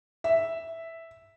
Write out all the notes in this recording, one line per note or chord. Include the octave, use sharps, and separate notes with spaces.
E5